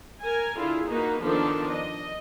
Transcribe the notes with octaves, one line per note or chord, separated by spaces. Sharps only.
A#4 G#5
D3 E4 F4 G#4
A#3 D#4 F#4 B4
D#3 F3 B3 D4 A4
D#5